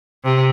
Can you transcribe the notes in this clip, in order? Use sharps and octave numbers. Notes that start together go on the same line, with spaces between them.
C3